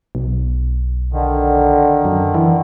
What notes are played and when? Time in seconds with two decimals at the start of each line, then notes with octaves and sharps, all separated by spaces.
0.15 B1
1.13 D3 D#3
2.05 F#2
2.34 E3